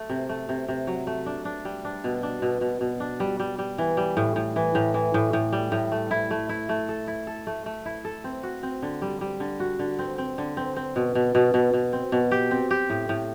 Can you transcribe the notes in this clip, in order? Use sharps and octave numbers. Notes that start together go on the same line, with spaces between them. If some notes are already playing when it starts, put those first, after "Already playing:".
Already playing: A3
C3
A3
C3
C3
F#3
A3
D4
D4
G3
D4
B2
D4
B2
B2
B2
D4
G3
G3
G3
E3
G3
A2
A2
E3
A2
E3
A2
A2
G3
A2
A3
E4
A3
E4
A3
A4
E4
A4
A3
A3
E4
A4
C4
F#4
C4
D3
G3
G3
D3
F#4
D3
C4
C4
D3
C4
C4
B2
B2
B2
B2
B2
C4
B2
G4
C4
G4
A2
A2